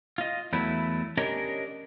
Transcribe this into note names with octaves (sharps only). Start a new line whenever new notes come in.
F4 D#5
E2 F#3 A3 E4
C#4 D4 G4 A#4 C#5 D#5